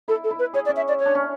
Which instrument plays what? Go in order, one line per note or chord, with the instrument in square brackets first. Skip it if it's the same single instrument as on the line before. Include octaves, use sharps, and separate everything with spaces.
[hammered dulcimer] E4 [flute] A4
[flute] A4
[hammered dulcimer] E4
[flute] B4
[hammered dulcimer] G#4 [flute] C#5
[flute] D5
[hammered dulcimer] C#4
[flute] E5
D5
C#5
[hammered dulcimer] D4
C#4